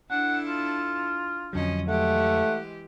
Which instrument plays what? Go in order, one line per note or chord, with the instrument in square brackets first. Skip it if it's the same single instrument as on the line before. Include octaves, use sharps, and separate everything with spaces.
[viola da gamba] D4 E4 A4 [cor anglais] F#5
[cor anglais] F4
[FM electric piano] F2 D3 F#3 [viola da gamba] F3 C#4 D#5
[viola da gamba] E3 G#3 G4 [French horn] A3 [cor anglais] F#5